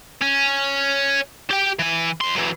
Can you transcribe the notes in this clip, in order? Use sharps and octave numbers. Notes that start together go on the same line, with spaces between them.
C#4
G4 G5
E3 G#5
F2 C6
E3 F#3